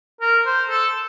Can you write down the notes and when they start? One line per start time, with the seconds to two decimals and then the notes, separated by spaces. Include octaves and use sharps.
0.21 A#4
0.46 C5
0.70 A4